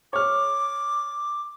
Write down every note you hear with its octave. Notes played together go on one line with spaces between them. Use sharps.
C#5 D6 F6